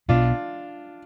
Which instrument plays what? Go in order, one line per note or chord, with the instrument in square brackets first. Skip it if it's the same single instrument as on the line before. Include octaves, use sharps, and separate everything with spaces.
[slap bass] B1 B2 B3 [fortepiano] D4 F4